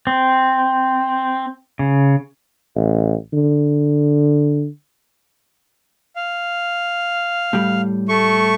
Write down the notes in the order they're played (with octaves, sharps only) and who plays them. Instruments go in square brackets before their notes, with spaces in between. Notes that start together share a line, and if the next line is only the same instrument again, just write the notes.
[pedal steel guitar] C4
C#3
[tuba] A1
D3
[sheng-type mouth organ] F5
[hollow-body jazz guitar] A2 G3
[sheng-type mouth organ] A3 C#6